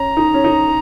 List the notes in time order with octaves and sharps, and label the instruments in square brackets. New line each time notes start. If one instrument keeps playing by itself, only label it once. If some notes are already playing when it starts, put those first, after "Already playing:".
Already playing: [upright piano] C#4 [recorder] A#5
[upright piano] D#4
C#4
D#4